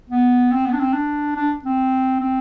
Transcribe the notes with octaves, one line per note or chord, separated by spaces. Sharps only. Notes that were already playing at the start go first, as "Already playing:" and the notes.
B3
C4
B3
D4
C4
D4
D4
C4
C4